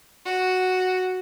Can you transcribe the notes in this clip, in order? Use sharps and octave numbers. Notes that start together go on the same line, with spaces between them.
F#4